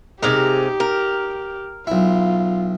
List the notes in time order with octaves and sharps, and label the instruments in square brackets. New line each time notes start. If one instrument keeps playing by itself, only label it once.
[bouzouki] C3 G#3 A#4 [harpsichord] D#4 [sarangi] G4
[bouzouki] A#4
[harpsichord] B1 E4 [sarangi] F4